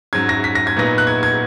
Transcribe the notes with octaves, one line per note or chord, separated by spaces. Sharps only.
G#2 F#3 C#4 G#6
A#6
B6
A#6
G#6
A#2 F#3 B3 D#4 A#6
F#6
G#6
G#6